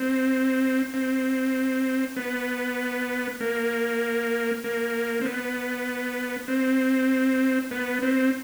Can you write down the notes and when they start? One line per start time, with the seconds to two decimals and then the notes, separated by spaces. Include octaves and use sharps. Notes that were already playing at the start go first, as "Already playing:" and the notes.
Already playing: C4
0.94 C4
2.16 B3
3.40 A#3
4.64 A#3
5.21 C4
5.25 B3
6.48 C4
7.71 B3
8.02 C4